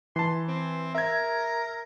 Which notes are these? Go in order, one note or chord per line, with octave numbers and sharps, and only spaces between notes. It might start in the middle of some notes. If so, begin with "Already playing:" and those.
E3 A5 C6
C4
A#4 E5 G#6